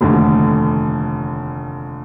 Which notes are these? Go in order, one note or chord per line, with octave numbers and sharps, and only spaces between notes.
F1 D#2 D3